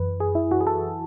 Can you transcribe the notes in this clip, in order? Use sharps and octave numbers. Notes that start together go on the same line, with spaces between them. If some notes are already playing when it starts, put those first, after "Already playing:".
Already playing: F#2 E3 B4
G#4
E4
F#4
G#4
A4